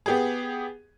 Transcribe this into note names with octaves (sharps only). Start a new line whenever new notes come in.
B3 G4 G#4